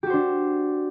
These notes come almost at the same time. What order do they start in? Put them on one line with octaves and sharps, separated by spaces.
G4 F#4 C5 D4